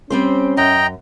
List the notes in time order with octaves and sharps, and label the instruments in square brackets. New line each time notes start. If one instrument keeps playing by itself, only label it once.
[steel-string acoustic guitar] G3 C4 C5 [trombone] C#4
[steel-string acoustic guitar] F#2 [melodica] D#5 G5 A#5